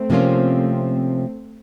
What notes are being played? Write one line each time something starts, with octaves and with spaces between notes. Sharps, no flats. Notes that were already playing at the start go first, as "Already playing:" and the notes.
Already playing: A3 C4
C3 F3 A#3 C#4 F4